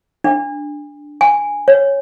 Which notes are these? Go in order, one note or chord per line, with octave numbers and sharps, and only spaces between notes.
D4
G#5
C#5